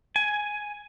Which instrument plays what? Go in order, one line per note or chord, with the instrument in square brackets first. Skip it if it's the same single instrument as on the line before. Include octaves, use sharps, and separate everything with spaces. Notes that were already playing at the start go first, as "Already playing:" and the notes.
[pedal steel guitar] G#5